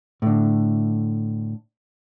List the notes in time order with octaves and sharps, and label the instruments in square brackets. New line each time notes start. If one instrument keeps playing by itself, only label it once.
[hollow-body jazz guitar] A2 D3